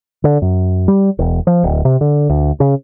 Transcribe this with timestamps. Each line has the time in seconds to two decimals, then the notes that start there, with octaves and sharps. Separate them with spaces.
0.24 D3
0.42 F#2
0.88 G3
1.19 E1
1.47 F3
1.63 D1
1.85 C3
2.01 D3
2.29 D2
2.60 C#3